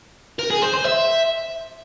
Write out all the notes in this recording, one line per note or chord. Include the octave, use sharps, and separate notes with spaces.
A#4
G#4
C5
C5
E5